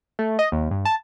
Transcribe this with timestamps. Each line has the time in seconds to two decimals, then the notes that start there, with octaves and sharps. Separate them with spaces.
0.19 A3
0.39 D#5
0.52 D#2
0.71 G2
0.85 A5